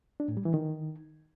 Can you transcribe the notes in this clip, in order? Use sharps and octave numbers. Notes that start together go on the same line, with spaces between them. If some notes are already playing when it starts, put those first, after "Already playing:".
D4
A2
G3
E3
D#3